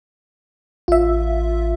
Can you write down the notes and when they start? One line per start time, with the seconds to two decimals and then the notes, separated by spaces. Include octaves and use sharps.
0.88 A1 F4 E5